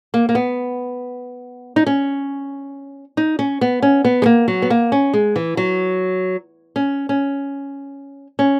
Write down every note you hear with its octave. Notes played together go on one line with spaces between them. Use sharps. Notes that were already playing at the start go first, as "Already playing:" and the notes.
A#3
A#3
B3
D#4
C#4
D#4
C#4
B3
C#4
B3
G#3
A#3
F#3
B3
A#3
C#4
G#3
E3
F#3
C#4
C#4
C#4